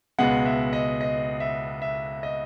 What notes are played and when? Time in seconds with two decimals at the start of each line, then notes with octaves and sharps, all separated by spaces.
0.19 C#2 B2 G#3 B3 F#5
0.46 E5
0.73 D#5
1.01 D#5
1.40 E5
1.82 E5
2.23 D#5